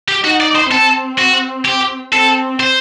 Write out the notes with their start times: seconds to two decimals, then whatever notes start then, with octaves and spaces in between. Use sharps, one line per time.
0.08 G4
0.24 D#4 F#4
0.40 D5
0.55 C5
0.71 C4 A4
1.19 F#4
1.66 G4
2.13 C4 A4
2.60 C5